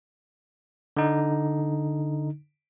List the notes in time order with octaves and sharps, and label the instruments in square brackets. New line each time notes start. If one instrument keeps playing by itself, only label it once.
[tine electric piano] D3 D#4